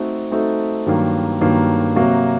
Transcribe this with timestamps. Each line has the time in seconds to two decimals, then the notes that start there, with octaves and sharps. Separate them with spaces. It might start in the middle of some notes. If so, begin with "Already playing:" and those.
Already playing: A3 C4 D#4 F#4 A4
0.31 A3 C4 D#4 F#4 A4
0.86 G2 D#3 F#3 A#3
1.41 G2 D#3 F#3 A#3
1.96 C3 F#3 A#3 F#4